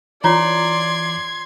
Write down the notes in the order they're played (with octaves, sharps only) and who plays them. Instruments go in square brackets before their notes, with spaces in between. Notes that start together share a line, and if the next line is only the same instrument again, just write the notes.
[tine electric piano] E3 [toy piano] F4 C#5 A#5 [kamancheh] D5 [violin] C6 G#6